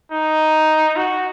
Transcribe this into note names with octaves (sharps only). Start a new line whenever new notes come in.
D#4
F#4